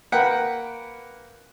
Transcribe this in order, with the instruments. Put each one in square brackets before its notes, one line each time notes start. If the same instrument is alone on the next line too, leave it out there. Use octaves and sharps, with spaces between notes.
[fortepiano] A#3 B4 F#5 G5